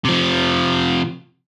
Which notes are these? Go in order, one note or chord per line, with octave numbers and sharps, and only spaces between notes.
C3 F3